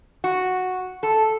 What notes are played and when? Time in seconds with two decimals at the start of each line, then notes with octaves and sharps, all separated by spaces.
0.24 F#4
1.03 A4